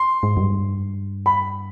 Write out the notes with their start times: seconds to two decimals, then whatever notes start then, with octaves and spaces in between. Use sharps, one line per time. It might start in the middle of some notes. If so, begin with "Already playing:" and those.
Already playing: C6
0.23 G#2
0.37 F#2
0.41 G2
1.26 B5